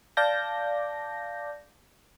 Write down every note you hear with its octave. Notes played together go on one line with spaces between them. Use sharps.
D5 F5 A5 D6 G6 A#6